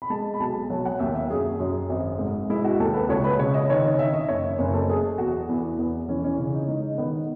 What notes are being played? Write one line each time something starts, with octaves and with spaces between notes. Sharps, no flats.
B5
G#3 A5
B5
B1 A5
F#3
F#5
D#2 E5
E5
F#2 G#4
F#2
G#1
G#2
G#3 E4
F#4
D#2 A4
B4
C#2 C#5
B4
C#3 C#5
D#5
D#3 C#5
D#5
D#3 E5
D#5
F#1 C#5
E5
F#1 C#5
A4
A3 G#4
E2 F#4
E2 E4
E2 B3
E3 C#4
C#4
C#3 C#4
D#4
G#3 D#4
D#3 B3